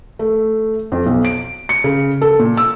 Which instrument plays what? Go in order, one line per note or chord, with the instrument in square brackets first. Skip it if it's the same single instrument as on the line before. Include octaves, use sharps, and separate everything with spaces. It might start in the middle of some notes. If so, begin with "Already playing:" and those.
[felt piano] A3
F2
B1
D7
C#7
C#3
A4
A#2
E6